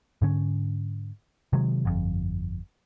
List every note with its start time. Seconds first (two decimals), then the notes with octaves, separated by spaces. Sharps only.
0.22 G#2 D3 C#4
1.53 C3 D#3 F#3 G#3
1.85 G1 F2